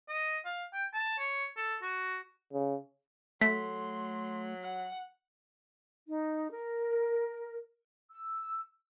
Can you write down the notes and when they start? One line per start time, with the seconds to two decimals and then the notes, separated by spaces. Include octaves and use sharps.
0.09 D#5
0.45 F5
0.74 G5
0.93 A5
1.19 C#5
1.57 A4
1.82 F#4
2.53 C#3
3.41 F#3 A3 C6 B6
4.63 F#5
6.08 D#4
6.52 A#4
8.12 E6